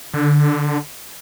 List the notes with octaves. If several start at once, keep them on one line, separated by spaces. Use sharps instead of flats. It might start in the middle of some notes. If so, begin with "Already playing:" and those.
D3